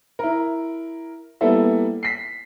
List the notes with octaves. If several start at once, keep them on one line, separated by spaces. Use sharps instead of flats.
E4 A#4
G3 A#3 B3 E4 A4 E5
B6 C7